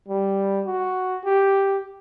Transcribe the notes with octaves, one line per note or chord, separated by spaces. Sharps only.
G3
F#4
G4